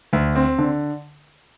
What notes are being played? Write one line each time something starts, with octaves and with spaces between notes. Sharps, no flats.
D2
C4
D3